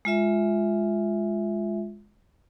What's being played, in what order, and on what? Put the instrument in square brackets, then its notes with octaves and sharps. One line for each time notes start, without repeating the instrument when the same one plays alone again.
[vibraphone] G#3 F4 E5